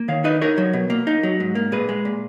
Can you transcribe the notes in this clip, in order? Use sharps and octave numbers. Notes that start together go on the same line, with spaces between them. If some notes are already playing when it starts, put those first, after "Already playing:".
Already playing: A#3
D#3 C#5 F5
D#4 B4 D#5
D#4 A#4 C#5
F#3
B2
A#3
D#4
F#3
G#2
A#3
A#2 G#4 B4
G#3
A#2